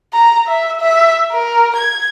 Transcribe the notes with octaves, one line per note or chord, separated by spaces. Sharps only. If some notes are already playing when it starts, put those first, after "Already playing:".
A#5
E5
E5
A#4
G#6